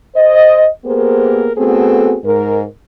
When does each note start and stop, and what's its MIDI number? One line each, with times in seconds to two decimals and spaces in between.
0.15 0.66 72
0.15 0.66 75
0.85 1.50 58
0.85 1.50 59
0.85 1.50 67
0.85 1.50 68
0.85 1.50 70
0.85 1.50 72
1.57 2.16 57
1.57 2.16 59
1.57 2.16 60
1.57 2.16 66
1.57 2.16 68
1.57 2.16 69
2.24 2.63 44
2.24 2.63 70